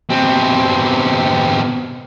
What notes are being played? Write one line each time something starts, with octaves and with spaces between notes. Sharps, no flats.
B2 C4